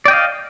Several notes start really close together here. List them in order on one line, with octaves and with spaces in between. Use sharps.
D5 G5 D#5 F5